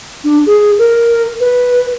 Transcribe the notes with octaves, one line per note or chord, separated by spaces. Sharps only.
D4
G#4
A#4
B4